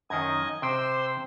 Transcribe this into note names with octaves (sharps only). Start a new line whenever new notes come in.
F#2 D#3 D#5 G#6
C3 C5 G5 C6 E6